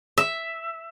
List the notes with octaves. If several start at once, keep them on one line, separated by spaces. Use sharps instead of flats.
E5